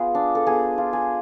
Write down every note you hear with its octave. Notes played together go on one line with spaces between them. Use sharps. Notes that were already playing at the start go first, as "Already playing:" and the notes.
Already playing: B3 F4 G#4
D4
A4
B3 G#4
F4
G#4